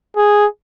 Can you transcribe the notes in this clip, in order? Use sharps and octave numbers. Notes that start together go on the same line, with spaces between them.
G#4